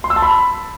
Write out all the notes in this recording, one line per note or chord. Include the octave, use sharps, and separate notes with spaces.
C6
E6
A5
B5